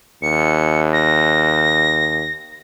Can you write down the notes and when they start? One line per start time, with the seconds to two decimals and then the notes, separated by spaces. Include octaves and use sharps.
0.22 D#2 C#7
0.93 A#6